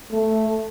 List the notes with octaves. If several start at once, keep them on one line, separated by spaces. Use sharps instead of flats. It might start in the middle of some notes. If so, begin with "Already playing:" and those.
A3